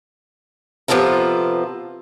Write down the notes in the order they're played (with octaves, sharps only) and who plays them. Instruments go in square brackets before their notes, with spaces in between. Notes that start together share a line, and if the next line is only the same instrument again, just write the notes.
[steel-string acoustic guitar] C3 F3 B3 F4 A4 A#4